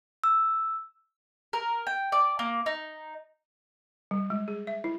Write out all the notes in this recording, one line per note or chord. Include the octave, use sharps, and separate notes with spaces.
E6
A#4
G5
D5
A#3
D#4
G3
G#3
G#4
E5
E4